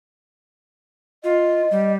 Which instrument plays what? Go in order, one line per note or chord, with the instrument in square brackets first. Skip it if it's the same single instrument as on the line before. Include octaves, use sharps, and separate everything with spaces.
[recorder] F4 [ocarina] D#5
[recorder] G3